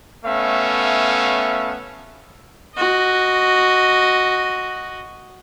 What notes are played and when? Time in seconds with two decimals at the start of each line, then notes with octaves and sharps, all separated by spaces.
0.25 A3 B3 C#4 E5 F5
2.76 F#4 D#5